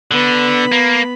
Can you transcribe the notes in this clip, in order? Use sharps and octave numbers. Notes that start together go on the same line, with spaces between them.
D3 B3 B5
A#3